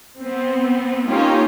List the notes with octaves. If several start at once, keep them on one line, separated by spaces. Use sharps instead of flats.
B3 C4
A#3 C#4 D#4 F4 G4